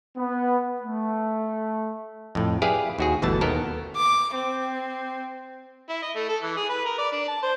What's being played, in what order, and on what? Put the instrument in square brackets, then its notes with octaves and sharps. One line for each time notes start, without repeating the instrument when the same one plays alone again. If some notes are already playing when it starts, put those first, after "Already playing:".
[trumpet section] B3
A3
[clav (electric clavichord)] F2 A2
E4 G4 G#4 B4 D5 F5
D#2 F#4 G#4
G1 B2 E3 A3 A5
D#2 B3 A4 A#4
[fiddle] D6
C4
[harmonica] E4
D#5
A3
A4
E3
G#4
B4
A#4
D5
D4
A5
C5